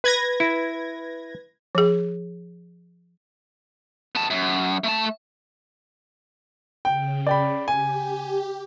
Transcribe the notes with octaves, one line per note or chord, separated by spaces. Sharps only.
B4 G#6 A#6
E4
F3 G#4
B3 A5
F#2
A3 A5
C#3 G5
D5 G5 B5
G4 G#5